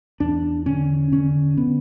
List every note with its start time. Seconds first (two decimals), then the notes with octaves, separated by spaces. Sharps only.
0.20 E2 D4
0.66 D3 C#4
1.12 D3 C#4
1.57 D3 B3